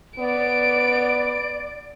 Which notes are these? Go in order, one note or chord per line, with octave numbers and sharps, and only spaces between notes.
B3 D5 D7